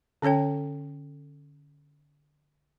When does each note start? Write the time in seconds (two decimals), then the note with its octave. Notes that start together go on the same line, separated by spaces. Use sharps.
0.22 D3 C#4 A4 C#5 G5